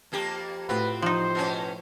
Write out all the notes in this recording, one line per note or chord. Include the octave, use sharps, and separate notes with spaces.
F2 A#3 G4
A2 C4 F4 F#4 B4
F3 D#4 C5
B2 C#4